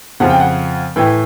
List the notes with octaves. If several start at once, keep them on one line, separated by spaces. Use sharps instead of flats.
F2 C#3 F3 F#5
G5
F#5
A2 E3 G5